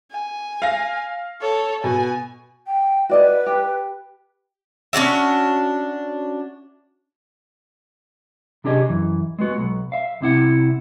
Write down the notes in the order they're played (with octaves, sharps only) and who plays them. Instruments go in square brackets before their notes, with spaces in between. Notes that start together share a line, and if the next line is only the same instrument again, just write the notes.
[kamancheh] G#5
[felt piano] F5 A#6
[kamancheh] A4 C#5
[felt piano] B2 [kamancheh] G#5
[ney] G5
[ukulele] F#4 D5 D#5 [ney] B4
[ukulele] G4
[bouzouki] C#4 D4 F#4 E5
[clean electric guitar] C3 D4 G4 G#4 D#5
F#2 E3
G#3 B3 F#4
B1
E5 F5
C2 C3 E4 F#5